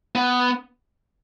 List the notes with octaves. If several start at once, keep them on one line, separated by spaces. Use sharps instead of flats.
B3